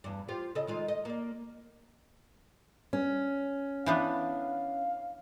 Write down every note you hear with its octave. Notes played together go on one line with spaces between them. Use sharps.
E2 G2
F4 G4 C5
C#3 A4 D#5
D#3 G#3 F4
D#5
A#3 D5
C#4
E3 B3 D4 F5